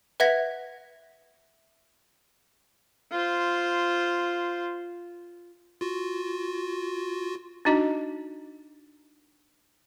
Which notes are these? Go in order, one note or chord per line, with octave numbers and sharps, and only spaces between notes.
B4 E5 F#5 G#6 A#6 B6
F4 C5
F4 F#4
D4 D#4 F#4 D#5 A#5